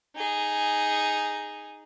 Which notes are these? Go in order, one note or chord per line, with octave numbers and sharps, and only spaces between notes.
D#4 G#4